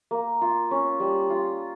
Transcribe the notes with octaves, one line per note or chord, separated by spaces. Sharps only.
A#3
F4
C#4
G3
F4